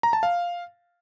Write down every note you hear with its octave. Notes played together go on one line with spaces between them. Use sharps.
A#5
A5
F5